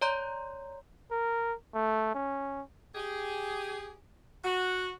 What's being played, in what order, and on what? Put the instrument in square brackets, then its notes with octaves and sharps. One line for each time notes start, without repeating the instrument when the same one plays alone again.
[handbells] C#5 D5 A#5 C6 G6
[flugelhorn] A#4
A3
C#4
[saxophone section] G4 G#4
F#4